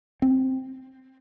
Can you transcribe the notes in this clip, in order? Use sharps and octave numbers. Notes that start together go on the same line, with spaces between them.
C4